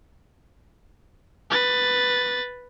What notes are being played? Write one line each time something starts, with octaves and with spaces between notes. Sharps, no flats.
B4 A6